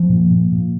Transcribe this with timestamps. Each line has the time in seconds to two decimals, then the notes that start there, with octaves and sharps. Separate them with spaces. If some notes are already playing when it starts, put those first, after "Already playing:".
Already playing: F3
0.09 A#2
0.30 A#2
0.52 A#2